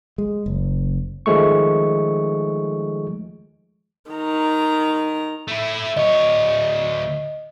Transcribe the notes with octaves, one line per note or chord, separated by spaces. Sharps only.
G#3
F#1
D#3 F3 G#3 A3 C#6
D#3 A#5
A3 E4
D2 C#5 D#5